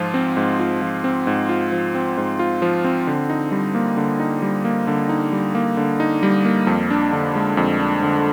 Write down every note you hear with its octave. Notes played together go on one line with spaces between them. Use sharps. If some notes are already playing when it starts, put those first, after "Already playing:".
Already playing: G#2 F3 F4
C4
G#2
F4
F3
C4
G#2
F4
F3
C4
G#2
F4
F3
C4
D3
D#4
G3
A#3
D3
D#4
G3
A#3
D3
D#4
G3
A#3
D3
D#4
G3
A#3
F2
D4
D3
G#3
F2
D4
D3